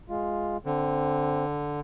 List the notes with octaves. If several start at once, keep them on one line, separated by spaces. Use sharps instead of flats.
G#3 F4
D3 C4